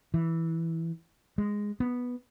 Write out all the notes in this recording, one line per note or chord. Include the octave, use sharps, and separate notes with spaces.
E3
G#3
B3